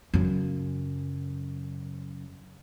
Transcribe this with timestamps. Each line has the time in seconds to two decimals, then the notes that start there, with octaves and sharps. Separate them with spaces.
0.14 F#2 C#3